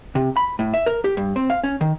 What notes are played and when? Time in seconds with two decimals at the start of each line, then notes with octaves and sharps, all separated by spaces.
0.15 C3
0.37 B5
0.59 A2
0.74 E5
0.86 A#4
1.04 G4
1.17 G2
1.36 C4
1.50 F5
1.64 C#4
1.81 D#3